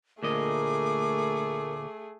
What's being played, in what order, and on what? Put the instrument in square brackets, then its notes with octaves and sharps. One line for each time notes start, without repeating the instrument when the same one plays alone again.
[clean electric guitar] D2 A#2 D#5 [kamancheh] A3 G#4 [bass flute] A#4 [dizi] D6